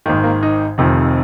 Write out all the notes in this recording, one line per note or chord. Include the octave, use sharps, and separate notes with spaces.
G#1 G#2 D#3 A#3
A#3
D#4
F1 F2 C3 D#3